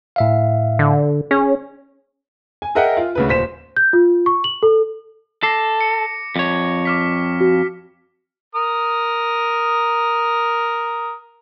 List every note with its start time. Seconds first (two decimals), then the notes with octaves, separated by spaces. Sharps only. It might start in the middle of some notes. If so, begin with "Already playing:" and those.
0.16 A2 E5 F5
0.79 D3
1.31 C#4 G#4 C#5
2.62 G#5
2.75 G#4 A#4 D#5 E5 F#5 G5
2.97 F4
3.15 D2 C#3 B4
3.28 D#1 C5 B6 E7
3.77 G6
3.93 F4
4.26 C#6
4.44 F#7
4.63 A4
5.43 A4 D6 A#6 C7
5.81 C#7
6.36 F2 C#5
6.85 D6 F6 B6
7.41 F#4
8.55 A#4 D#6